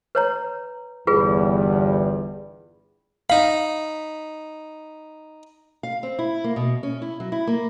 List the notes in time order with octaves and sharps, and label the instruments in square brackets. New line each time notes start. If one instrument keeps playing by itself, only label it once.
[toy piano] B4 C#5 A#5
[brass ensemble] G1 E2 G3 [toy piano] F4 G#4 B4
[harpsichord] D#4 B5 [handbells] F5
[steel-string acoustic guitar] F5
C4
E4
A#3
B2
C#4
E4
F#3
E4
A#3